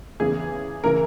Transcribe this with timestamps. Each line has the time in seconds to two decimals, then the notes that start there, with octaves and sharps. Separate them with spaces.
0.20 E2 C#3 E3 G#4
0.84 C#3 E3 A#4